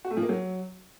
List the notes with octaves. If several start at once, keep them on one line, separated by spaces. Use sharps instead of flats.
F#4
A3
F3
A#3
F#3